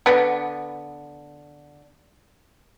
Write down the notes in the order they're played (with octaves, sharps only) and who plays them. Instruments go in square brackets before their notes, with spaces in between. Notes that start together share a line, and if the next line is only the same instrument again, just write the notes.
[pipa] D3 B3